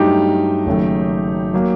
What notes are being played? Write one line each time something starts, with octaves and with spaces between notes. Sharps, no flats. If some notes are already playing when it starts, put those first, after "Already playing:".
Already playing: G2 F#3 A3 D#4 G4
F#1 F#2 D#3 A3
F#3 A#3